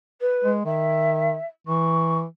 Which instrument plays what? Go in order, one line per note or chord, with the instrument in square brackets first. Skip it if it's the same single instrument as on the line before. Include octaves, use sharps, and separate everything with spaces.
[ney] B4
[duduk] G#3
[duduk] D#3 [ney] E5
[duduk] E3 [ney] C#6